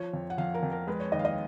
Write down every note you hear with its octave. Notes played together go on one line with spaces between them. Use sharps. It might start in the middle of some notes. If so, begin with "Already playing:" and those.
Already playing: F3 C#5
F2
F#5
F2 F5
A#4
F2
A#4
G#3 B4
C#5
D#2 D#5
F5
D#5